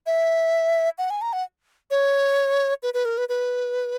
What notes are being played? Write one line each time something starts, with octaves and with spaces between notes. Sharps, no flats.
E5
F#5
G#5
A#5
F#5
C#5
B4
B4
A#4
B4
B4